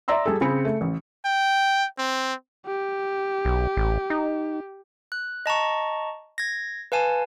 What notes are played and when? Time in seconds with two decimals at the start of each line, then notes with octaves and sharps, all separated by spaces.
0.08 D5 E5 A#5 C6 E6
0.26 G3 G#4 A4
0.41 C#3 C4 G#4 B5 C#7
0.65 A3
0.81 A1
1.26 G5
1.99 C4
2.67 G4
3.45 B1
3.77 A1
4.10 D#4
5.12 F#6
5.46 D#5 A5 A#5 C#6
6.38 G#6 A#6
6.92 B4 F5 G#5 A5